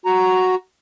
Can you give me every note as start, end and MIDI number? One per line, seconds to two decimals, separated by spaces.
0.06 0.55 66
0.06 0.55 82